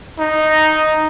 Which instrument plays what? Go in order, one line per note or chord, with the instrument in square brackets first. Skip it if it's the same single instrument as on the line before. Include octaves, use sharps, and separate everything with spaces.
[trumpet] D#4